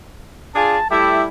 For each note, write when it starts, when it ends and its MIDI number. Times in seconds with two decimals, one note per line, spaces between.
0.55 0.78 62
0.55 0.78 65
0.55 0.78 68
0.55 0.88 81
0.91 1.27 55
0.91 1.27 57
0.91 1.27 64
0.91 1.23 67